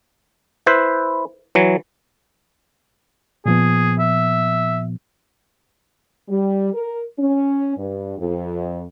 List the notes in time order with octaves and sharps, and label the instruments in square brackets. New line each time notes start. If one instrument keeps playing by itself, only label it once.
[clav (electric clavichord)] E4 B4 C5
E3 F#3
[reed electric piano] A#2 F3 B3 [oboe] G#4
[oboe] E5
[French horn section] G3
A#4
C#4
G2
F2